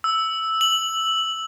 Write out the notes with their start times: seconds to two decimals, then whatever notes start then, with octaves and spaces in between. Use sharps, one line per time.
0.04 E6
0.61 F#7